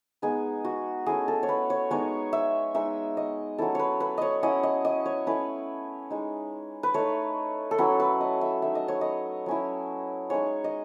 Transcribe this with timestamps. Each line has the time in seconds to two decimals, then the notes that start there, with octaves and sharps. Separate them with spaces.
0.22 G#3 B3 D#4 G#4
0.64 F#4
1.06 A3 C#4 E4 G#4
1.28 A4
1.43 C#5
1.49 B4
1.70 C#5
1.91 G#3 B3 D#4 C#5
2.33 E5
2.75 G#3 D#4 E5
3.17 D#5
3.58 F#3 C#4 E4 A4
3.75 B4 C#5
4.00 B4
4.18 C#5 D#5
4.43 F#3 C#4 E4 D#5
4.63 D#5
4.85 D#5
5.06 C#5
5.26 A3 C#4 E4 B4
6.11 G#3 D#4
6.83 B4
6.94 A3 D#4 C#5
7.71 A4
7.78 F#3 C#4 E4 B4
8.00 B4
8.21 D#5
8.41 E5
8.62 A3 D#4 E5
8.75 D#5
8.88 C#5
9.01 D#5
9.46 F#3 C#4 E4
10.30 G#3 D#4 C#5
10.64 D#5